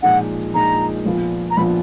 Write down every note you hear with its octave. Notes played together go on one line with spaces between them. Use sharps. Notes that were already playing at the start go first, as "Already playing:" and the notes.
A#2 F3 G#3 D#4 F#5
A#2 F3 G#3 D#4 A#5
A#1 A#2 F3 B3 F4
A#5
A#1 A#2 F3 B3 F4 B5